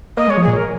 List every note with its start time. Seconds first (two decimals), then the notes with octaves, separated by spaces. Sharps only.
0.17 A#3 D#5
0.27 G#3 C#5
0.37 F3
0.43 A#2 G#4
0.56 A#4